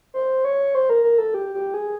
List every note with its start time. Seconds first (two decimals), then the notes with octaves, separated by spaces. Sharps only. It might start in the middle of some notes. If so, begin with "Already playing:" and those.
0.14 C5
0.45 C#5
0.75 C5
0.90 A#4
1.03 A#4
1.18 A4
1.34 G4
1.54 G4
1.74 G#4